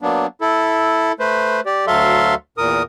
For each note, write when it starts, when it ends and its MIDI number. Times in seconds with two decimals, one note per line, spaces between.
0.02 0.26 54
0.02 0.26 58
0.02 0.26 59
0.02 0.26 62
0.41 1.12 64
0.41 1.12 69
1.20 1.61 57
1.20 1.61 71
1.20 1.61 72
1.66 1.85 67
1.66 1.85 74
1.87 2.34 38
1.87 2.34 54
1.87 2.34 69
1.87 2.34 76
1.87 2.34 77
1.87 2.34 84
2.58 2.83 40
2.58 2.83 46
2.58 2.83 70
2.58 2.83 87